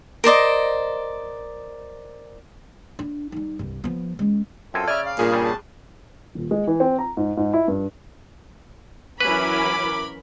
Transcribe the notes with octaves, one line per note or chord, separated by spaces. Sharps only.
A#4 C5 D5 D#5
D4
G3 D#4
C2 G2
F3 B3
G#3 C#4
F#2 C4 F4 A4 G#5
C#3 D5 E5 G#5 F6
F5
G2 A#2 G#4
C#3 G3
A5
D#1
G#3
E3
C4
A#5
G#2
G#2
E4
G2
E3 F#3 C#4 A#4 B4 B5 D6